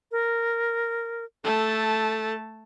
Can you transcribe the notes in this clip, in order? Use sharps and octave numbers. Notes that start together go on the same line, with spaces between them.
A#4
A3 A4 A5